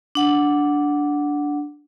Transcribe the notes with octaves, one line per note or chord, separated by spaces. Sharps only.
D4 F#5